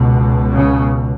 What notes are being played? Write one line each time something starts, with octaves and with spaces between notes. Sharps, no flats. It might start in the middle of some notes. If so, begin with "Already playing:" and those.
Already playing: C#2 B2
C#3